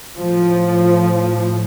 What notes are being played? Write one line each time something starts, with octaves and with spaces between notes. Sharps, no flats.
A2 F3